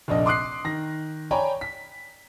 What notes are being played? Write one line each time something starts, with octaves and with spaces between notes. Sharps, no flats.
F1 A#1 D4 D#5
C6 D6 D#6 F#6 C7
D#3 A#6
C#5 D5 G5 G#5 A#5 B5
B6